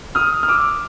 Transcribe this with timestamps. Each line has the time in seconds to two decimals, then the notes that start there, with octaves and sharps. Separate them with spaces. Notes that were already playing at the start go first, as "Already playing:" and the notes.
0.15 D#6 F6
0.43 F6
0.48 D6 E6